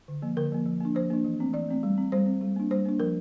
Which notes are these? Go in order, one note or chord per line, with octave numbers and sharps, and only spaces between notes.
D3
F3 A#3
D3 A#4
F3 A#3
F3
A#3 D4
F3 C5
A#3 D4
E3
A3 C4
E3 D5
A3 C4
G3
C4
G3 C5
C4
G3
A#3 D4
G3 C5
A#3 D4
F3 A#4